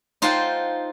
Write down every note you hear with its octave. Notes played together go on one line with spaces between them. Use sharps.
D#4 F4 C5 F#5 G5 A5